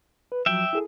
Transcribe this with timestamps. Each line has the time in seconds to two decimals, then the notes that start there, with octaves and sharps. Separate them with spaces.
0.32 B4
0.46 F3 F#3 E5 G5
0.73 E4 G#4 A4